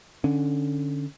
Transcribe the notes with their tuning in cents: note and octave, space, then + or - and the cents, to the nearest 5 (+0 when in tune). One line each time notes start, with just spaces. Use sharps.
D3 +5 C#4 +0